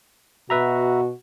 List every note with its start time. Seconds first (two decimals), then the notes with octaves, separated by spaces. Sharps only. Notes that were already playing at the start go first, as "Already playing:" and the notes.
0.50 B2 F#4 B4 E5 A#5